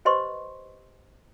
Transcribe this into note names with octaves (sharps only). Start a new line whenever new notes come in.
G4 B4 C5 D#5 C6 C#6